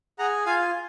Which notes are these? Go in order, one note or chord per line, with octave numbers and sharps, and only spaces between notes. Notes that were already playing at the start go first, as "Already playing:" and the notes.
G#4 F#5 A#5
F4 F5 G#5